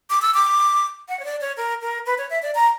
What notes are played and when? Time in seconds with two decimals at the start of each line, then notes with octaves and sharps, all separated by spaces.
0.10 D6
0.22 E6
0.34 D6
1.09 F#5
1.20 C#5
1.25 D5
1.41 C#5
1.57 A#4
1.82 A#4
2.06 B4
2.18 C#5
2.30 E5
2.42 D5
2.55 A#5